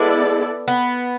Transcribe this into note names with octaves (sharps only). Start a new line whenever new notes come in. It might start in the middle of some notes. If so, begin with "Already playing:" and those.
Already playing: G#3 B3 E4 A4 D5
B3